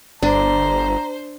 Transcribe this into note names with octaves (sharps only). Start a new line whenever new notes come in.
G1 D4 C5 A#5